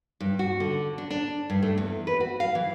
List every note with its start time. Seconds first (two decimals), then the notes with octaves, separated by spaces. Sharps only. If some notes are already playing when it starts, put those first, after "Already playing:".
0.20 G2
0.39 F#4
0.60 D3
0.98 D4
1.10 D4
1.50 G2
1.62 A3
1.78 E2
2.07 B4
2.20 F#4
2.40 F5
2.55 E3